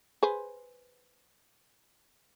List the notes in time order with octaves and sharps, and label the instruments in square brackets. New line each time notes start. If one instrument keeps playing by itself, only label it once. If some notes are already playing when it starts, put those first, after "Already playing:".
[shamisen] G#4 B4 C5